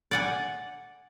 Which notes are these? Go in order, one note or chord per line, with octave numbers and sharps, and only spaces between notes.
D5 F#5 G#5